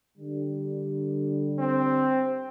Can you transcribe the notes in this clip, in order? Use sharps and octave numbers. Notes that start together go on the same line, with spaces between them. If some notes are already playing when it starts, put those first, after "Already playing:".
D3 G3
C4